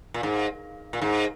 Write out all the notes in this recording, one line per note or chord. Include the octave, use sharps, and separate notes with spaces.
A#2
G#2
A#2
G#2